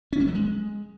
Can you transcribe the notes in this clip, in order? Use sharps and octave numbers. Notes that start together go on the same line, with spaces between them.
C#4
G3
F#3
G#3